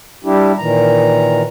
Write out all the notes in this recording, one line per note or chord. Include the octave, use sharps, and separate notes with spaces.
G3 D4 E4 G4
A#2 D#3 E3 A#5